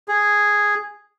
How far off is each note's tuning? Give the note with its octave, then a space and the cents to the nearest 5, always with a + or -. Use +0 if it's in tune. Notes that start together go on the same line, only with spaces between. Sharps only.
G#4 -5